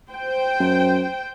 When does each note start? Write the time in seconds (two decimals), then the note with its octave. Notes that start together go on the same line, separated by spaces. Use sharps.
0.10 C5 G5
0.60 F#2